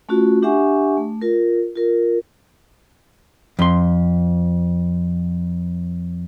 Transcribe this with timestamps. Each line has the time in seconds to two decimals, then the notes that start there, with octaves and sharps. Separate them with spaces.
0.09 A3 C#4 F4 F#4
0.42 D4 G4 E5 F#5 G#5 C#6
0.98 A3
1.22 F4 A#4
1.76 F4 A#4
3.59 F2 C6